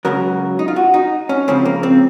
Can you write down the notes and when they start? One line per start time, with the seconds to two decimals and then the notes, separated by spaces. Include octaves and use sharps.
0.05 C#2 C#3 F#3 A#4
0.59 D#4
0.68 F4
0.76 F#4
0.94 D#4
1.29 C#4
1.48 C#2 C#3 F3 C4
1.65 A#3
1.83 C4